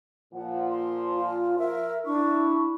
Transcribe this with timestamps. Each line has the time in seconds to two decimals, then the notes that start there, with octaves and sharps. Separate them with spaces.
0.34 A#2 F3 F#5
0.70 C6
1.15 F4
1.58 A#4 E5
2.05 D4 E4 C#6